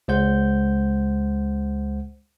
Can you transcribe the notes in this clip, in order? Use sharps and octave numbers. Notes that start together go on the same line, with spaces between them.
C#2 G#3 C5 F#5 G6